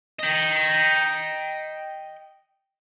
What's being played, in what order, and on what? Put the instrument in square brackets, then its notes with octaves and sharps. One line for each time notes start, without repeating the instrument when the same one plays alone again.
[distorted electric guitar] D#5 G5